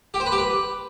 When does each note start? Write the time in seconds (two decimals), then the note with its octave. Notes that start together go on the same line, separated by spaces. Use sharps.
0.14 G4
0.20 C5
0.26 B4
0.32 G4
0.38 B4